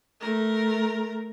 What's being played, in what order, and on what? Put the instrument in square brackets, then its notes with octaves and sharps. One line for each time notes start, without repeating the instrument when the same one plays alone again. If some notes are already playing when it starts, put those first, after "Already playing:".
[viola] A3 A#4